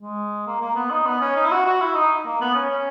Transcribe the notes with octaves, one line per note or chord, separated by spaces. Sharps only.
G#3
A#3
A#3
B3
D#4
B3
C#4
D#4
E4
F#4
F#4
E4
D#4
A#3
B3
C#4
C#4